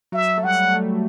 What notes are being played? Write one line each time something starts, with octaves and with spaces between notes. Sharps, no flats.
F#3 E5
A3
G3 F#5
A3